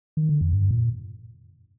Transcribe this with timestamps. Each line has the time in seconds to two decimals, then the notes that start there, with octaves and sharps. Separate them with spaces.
0.17 D#3
0.29 D3
0.41 F2
0.53 G2
0.71 A#2